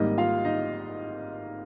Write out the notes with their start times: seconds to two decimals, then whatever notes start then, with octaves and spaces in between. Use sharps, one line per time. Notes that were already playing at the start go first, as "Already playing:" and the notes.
Already playing: G#1 G#2 G3 A#3 D#4 D#5
0.18 F4 F5
0.45 D#4 D#5